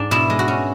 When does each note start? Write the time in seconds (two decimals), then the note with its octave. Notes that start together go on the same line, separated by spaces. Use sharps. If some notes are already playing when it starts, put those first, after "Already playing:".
Already playing: G#2 D4
0.11 B2 E4
0.30 G#3
0.39 F#4
0.48 C#4